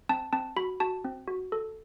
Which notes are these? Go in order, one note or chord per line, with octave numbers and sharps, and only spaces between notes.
C4 A5
C4 A5
F#4 B5
F#4 A5
C4
F#4
A4